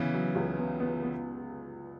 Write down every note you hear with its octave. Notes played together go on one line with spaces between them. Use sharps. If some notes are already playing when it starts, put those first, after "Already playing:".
Already playing: C#3 E3 B3
F#3
C#2
B3
B3
B3